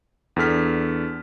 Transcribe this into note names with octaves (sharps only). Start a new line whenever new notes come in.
E2 D4 A4 F6 B6